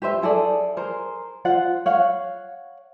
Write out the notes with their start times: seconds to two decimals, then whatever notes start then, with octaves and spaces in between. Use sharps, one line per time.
0.02 G4 B4 C5 E5
0.22 E4 G#4 A4 D5
0.77 G#4 A#4 C5
1.45 F4 C5 F#5
1.86 C#5 F5 F#5